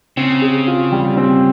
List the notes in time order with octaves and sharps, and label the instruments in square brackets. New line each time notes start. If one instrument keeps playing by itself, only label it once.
[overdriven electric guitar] C#3 [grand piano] C4
[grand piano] G#4
F4
G3
C4